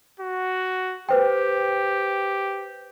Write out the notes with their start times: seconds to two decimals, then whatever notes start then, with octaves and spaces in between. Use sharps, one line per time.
0.20 F#4
1.09 G4 B4 C5 G5